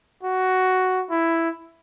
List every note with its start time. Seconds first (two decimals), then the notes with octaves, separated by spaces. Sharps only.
0.23 F#4
1.10 E4